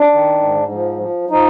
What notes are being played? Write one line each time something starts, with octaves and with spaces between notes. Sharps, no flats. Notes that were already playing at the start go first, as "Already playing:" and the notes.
Already playing: D4
D#3
G#2
F3
F3
F3 D#4